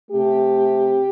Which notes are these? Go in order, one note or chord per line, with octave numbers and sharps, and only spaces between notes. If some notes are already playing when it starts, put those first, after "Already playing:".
A3 G4
C3